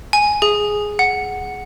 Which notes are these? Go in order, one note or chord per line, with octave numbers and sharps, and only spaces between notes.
G#5
G#4
F#5